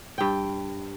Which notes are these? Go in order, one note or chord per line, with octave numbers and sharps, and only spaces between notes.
G2 G5